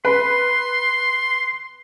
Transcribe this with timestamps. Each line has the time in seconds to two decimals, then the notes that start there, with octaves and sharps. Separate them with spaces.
0.05 B4 C6